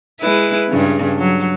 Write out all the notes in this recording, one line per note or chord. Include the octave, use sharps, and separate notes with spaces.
G#3 E4 B4
G2 C#3
F#3